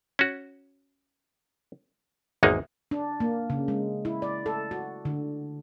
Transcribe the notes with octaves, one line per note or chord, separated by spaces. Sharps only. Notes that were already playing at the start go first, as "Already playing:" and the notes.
C#4 F#4
G#1 E2 G#3 A#3 D#4
D4
A#3
C#3
G#3
E4
D5
A4
F#4
D3